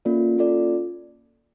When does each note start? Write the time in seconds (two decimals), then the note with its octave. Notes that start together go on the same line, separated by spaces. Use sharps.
0.05 A#3 C#4 F4 A4 D5
0.37 A#3 C#4 F4 A4 D5